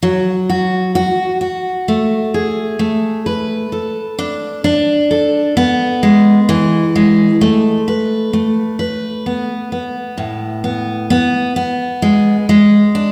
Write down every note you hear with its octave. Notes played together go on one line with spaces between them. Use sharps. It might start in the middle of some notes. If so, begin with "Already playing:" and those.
F#3
F#4
F#4
F#4
A3
G#4
A3
B4
A4
D4
D4
A4
B3
G#3
E3
G#3
A3
B4
A3
B4
B3
B3
A2
B3
B3
B3
G#3
G#3
D4